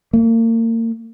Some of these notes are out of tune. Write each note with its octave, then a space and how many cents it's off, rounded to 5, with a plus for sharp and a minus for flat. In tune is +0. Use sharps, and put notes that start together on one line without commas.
A#3 -35